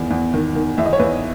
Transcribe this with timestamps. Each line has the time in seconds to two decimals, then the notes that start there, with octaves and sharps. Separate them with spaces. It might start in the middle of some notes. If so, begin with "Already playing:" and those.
Already playing: E2 D#3
0.10 E2
0.34 D#3
0.55 D#3
0.78 E2 E5
0.85 D#5
0.93 C#5
0.99 E2 B4